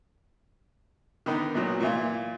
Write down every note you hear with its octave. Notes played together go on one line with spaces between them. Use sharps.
D3 D#3 B3 D#4
B1 A#2 F#3
A#2 E3 F4